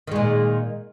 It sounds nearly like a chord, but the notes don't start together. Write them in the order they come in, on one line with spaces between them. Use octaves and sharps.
D#3 G#3 A#2